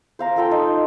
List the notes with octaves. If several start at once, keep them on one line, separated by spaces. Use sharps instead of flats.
C5 F5 A#5
F3 A4 G5 C6
D#4